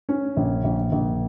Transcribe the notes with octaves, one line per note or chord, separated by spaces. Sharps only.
C#4
A#1
A#1
A#1